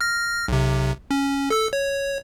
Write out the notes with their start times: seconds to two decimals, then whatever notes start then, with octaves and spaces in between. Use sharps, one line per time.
0.01 F6 A#6
0.48 B1 C3
1.11 C#4
1.50 A4 E6
1.73 C#5